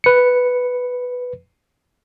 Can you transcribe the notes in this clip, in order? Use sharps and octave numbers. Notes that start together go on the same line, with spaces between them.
B4 C#7